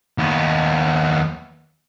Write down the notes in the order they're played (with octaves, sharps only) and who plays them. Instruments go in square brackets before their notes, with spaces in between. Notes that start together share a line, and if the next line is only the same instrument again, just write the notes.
[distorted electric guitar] D#2 B3